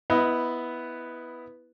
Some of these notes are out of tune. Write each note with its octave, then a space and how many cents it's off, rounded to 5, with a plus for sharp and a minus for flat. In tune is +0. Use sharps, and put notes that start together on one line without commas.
B3 +0 E4 -5 D#5 +15